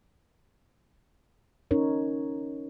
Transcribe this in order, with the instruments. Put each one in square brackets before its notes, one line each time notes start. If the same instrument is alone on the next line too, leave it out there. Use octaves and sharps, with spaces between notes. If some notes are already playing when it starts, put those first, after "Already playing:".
[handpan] C#4 D#4 A#4 C#5